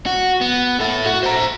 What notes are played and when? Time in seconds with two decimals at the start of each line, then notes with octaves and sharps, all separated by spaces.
0.06 F#4
0.41 B3
0.80 E4 A4
1.06 F#4
1.23 C5 A#5